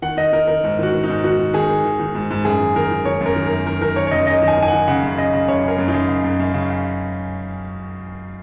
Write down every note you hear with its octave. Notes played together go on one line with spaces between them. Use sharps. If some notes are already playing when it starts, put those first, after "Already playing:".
D#3 F#5
D#3 D#5
D#3 A#4
D#3 A#4
G#2
D#3 F#4
D#3
D#4
G#2
D#3 F#4
D#3
D#3 G#4
D#3
D#3
D#3
G#2
G#2
F#2 G#4
D#3
D#3 A#4
D#3
D#3 C#5
F#2
A#4
D#3
F#2 A#4
D#3 A#4
D#3 A#4
D#3 C#5
C#5
F#2 D#5
F#2 D#5
D#3
G#5
D#3
G#5
D#3 F#5
C#3 F#5
F#2
C#3 D#5
C#3
F#2 C#5
C#3 A#4
F#2
D#4
F#2
C#3
F#2
F#2
C#3
C#3